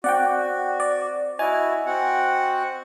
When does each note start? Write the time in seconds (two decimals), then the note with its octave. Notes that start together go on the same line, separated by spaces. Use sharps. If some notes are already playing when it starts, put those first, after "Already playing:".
0.04 C4 F#4 D5 F#5 G5
0.80 D5
1.39 E4 F#4 D#5 G#5
1.86 C4 F#4 F#5